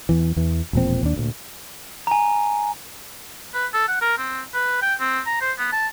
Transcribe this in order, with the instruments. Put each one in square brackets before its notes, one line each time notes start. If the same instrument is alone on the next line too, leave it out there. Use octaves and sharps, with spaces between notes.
[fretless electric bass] E2 E3
E2 E3
E1 A#2 F3 C4
D#2 D4
D2 A#2
[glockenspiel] G#5 A#5
[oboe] B4
A4
F#5
A#4
C4
B4
G5
C4
A#5
C5
B3
A5